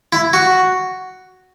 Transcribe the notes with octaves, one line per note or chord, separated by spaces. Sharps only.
E4
F#4